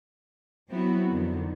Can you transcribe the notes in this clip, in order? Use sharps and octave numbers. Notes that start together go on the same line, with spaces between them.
F#3 B3 C4 E4 F#4
F2 D3 D#3 F3